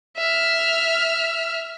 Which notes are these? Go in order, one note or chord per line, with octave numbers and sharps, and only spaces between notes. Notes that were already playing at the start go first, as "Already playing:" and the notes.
E5 F6